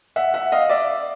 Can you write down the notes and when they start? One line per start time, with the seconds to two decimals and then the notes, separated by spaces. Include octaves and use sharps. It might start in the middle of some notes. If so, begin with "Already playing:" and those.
0.16 E5 F#5
0.34 E5 F#5
0.52 D#5 F5
0.69 D5 E5